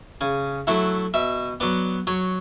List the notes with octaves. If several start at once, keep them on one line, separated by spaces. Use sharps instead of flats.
C#3 G#5
F#3 A3 E4 F#5
B2 E5
F#3 B3 D5
F#3 C#5